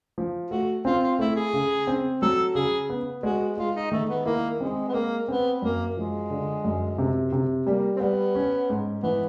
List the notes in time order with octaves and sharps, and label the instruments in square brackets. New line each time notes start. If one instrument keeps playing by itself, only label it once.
[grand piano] F3
[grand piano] A3 [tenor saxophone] F#4
[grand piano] C4 [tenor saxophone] F4
[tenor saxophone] F4
[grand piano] A3 [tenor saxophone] E4
[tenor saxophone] G#4
[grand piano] C#3
C4
[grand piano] F#3 [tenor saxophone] A4
[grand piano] C#3 [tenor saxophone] G#4
[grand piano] B3
[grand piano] G#3 [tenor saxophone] F#4
[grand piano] G#3 [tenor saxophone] F4
[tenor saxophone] D#4
[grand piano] D#3 [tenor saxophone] A3
[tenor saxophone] B3
[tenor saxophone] A#3 [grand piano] E4
[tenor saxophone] G#3 [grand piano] C4
[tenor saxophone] B3
[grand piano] G#3 [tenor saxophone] A#3
[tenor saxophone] B3 [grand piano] C4
[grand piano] F#2 [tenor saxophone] A#3
[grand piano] F3 [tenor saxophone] G#3
[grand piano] D3
F#2
C3
C3
[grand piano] G3 [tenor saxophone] A#3
[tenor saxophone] C4
[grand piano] G3 [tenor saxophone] B3
[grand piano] C#4
G#2
[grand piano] E3 [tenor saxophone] B3